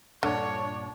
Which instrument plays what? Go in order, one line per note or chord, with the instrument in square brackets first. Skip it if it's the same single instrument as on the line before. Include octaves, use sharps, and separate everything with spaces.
[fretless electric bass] D#1 G2 A#2 [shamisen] D3 [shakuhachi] D4 [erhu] C#5